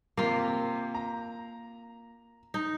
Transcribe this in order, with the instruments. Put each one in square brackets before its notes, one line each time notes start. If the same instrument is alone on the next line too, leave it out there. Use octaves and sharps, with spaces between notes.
[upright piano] C3 [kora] A#3 F4
[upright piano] A#5
[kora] D#4